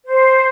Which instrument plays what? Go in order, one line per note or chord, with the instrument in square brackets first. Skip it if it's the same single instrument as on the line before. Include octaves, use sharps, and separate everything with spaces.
[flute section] C5